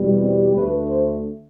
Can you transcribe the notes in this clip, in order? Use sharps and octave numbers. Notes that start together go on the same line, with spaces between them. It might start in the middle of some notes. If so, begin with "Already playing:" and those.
Already playing: E2 B2 G3
C4
D2 D3 A3 B4
C5